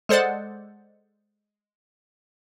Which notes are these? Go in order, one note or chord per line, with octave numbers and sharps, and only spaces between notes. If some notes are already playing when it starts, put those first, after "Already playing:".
G#3 A4 C5 D5 F#5